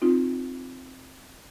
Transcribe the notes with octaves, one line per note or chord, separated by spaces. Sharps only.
C4 D#4 F4